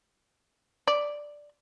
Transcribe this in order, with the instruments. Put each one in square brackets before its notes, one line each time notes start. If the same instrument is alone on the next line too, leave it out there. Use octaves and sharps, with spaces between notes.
[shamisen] D5